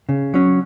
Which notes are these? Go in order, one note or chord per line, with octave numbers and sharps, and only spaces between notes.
C#3
F#3 C#4